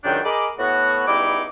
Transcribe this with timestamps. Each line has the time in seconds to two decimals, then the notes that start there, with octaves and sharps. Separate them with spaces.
0.04 C#2 F#2 A2 D#3 D4 G5
0.24 G#4 A#4 D#5 B5 D6
0.58 A2 B3 F#4
1.07 C#2 G3 B3 D#4 E4 D6